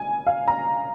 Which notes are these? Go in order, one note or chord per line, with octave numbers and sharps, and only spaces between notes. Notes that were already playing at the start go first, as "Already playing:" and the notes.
Already playing: G#5
F5
A#5